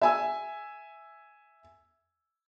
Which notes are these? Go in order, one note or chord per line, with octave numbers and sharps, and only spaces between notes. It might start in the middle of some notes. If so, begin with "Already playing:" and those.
E5 G#5 E6